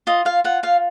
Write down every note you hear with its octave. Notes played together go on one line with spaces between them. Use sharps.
F4 D#5
F4 F5
F4 F#5
F4 F5